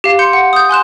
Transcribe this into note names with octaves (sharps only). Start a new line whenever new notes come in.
G4 F5
C6 G6 C#7
F#5
D#6 G6
G#5 C6 F#6 E7